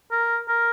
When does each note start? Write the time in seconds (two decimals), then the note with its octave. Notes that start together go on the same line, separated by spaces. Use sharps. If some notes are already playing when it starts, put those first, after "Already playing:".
0.11 A#4
0.48 A#4